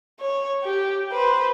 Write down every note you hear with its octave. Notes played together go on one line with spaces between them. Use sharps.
C#5
G4
B4 C5